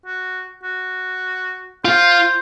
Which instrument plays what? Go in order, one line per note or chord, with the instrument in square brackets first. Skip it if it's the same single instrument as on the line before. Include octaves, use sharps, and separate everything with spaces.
[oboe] F#4
F#4
[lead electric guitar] F4 [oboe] C5